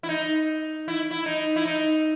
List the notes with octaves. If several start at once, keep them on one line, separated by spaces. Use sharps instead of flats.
E4
D#4
E4
E4
D#4
E4
D#4